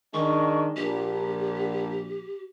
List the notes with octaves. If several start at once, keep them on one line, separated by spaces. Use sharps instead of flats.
D#3 G#3 D4 C#6
A#1 G4